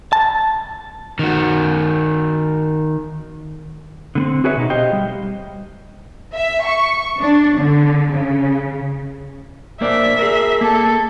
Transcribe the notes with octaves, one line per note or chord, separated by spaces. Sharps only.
A5
D#3 F#4
D3 B3 C4
F#4 G#4 B4 C#5 E5
B2 D#4
G4 C5 D#5 F5 G5
G3
E5
C#6
D4
D3
C#3
A#3 C5 D5 E5
G#4 A#4
A#3 A4